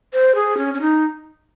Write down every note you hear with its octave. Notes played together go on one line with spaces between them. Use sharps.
C5
G#4
C#4
C#4
D#4